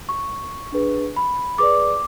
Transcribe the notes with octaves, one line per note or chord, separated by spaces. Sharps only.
C#6
D4 G#4 B4
B5
G#4 B4 D5 D6